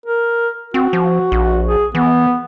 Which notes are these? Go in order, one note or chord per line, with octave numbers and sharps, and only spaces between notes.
A#4
C4 F#4
F3
A#1
G#4
E3 B3